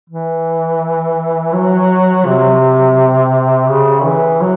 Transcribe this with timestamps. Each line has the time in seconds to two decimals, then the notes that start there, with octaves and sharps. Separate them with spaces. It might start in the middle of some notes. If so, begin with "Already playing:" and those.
0.10 E3
1.53 F#3
2.26 C3
3.69 C#3
4.05 E3
4.41 F#3